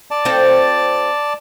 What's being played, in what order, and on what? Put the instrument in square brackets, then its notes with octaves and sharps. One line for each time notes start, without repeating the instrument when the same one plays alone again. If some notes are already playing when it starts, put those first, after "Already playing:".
[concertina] D5 A5
[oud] C4 F4 A4